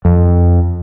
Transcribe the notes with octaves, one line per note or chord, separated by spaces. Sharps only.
F2